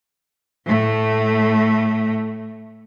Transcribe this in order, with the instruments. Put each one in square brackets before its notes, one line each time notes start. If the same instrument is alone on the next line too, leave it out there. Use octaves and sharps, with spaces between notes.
[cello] A2 A3